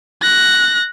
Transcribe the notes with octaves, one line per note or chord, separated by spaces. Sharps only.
F#6 A#6